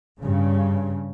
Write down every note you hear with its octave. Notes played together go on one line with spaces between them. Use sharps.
G2 C#3